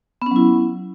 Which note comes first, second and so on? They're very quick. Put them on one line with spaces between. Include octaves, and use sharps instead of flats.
B3 C#4 F#3 E4